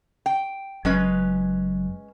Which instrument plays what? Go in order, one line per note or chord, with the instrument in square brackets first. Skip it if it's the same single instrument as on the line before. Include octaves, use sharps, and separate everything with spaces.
[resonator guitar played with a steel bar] G5
[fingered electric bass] F#1 F#3 [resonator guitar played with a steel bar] G#3 C#4 B4